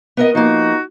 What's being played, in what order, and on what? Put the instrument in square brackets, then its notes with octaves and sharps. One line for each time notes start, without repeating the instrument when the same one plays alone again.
[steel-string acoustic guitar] B3 A#4 D#5
[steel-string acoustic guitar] F3 A#3 [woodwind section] D#4 F#4